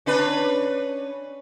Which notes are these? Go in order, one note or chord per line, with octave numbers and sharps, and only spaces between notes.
C#4 D4 B4